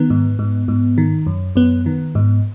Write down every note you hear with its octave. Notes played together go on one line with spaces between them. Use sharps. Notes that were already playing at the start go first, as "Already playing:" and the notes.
Already playing: D#3 B3
G#2
G#2
G#2
D#3
F#2
F#2 B3
D#3
G#2